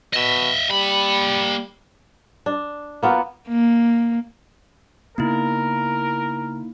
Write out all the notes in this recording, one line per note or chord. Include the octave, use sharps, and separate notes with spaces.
B2 D#5 E5
G3 A#3 B5
D4
A#3 B3 F4 F#4
A#3
C#3 A#3 B3 D#4 E4 A#4